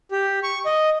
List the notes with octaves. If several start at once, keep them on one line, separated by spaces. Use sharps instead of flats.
G4
C#6
D#5